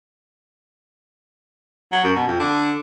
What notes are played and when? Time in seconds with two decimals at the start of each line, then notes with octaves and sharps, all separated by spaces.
1.92 F#3
2.04 F#2
2.16 B2
2.28 F2
2.40 D3